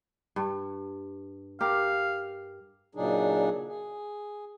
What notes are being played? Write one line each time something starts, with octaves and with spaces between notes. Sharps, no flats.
G2
G4 A#4 F5
A#2 C#3 F#3 D4 D#4 G#4
G#4